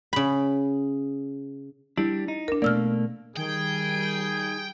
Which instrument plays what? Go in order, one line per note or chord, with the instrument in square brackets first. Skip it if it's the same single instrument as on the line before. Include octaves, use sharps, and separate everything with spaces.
[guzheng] C#3 B5
[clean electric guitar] G3 D4 [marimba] E4
[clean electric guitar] D#4
[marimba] D4 A#4
[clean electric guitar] B2 A3 A#3 [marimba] D5 E6 F6
[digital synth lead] D#3 [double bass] G3 [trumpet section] G#4 [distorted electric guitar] G5